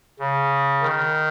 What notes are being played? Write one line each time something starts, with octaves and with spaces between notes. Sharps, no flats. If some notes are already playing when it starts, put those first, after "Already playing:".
C#3
D#3